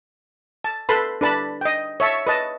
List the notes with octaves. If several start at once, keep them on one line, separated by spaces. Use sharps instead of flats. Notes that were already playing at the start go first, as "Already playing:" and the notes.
A5
A4 B4 A5 B5 C6
D4 B4 A5 B5
D#5 G5
C#5 E5 A5 E6
B4 D#5 A5